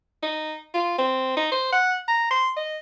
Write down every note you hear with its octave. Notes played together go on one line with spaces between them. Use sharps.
D#4
F4
C4
D#4
C5
F#5
A#5
C6
D#5